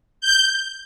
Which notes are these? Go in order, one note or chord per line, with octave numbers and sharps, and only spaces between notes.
G6